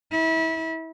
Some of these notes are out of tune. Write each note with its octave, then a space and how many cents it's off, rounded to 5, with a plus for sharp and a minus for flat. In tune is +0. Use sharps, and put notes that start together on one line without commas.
E4 -30